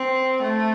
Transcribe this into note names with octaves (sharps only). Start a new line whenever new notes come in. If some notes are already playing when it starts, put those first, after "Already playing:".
Already playing: C4
A3